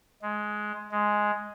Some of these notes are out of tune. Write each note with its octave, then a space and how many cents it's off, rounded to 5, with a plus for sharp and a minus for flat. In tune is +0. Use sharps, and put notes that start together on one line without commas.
G#3 +15
G#3 +5